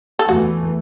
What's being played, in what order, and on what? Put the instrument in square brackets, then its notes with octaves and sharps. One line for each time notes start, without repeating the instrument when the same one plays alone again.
[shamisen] A4
[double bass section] E2 E3 A3 [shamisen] F#4